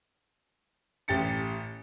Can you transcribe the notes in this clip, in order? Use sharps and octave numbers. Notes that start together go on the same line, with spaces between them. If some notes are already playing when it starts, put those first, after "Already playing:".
A1 G4 A6 C#7